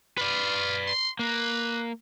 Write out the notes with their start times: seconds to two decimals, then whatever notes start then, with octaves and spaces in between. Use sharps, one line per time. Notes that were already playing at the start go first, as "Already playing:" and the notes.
0.18 F4 B4 D5
0.87 C6
1.19 A#3 B4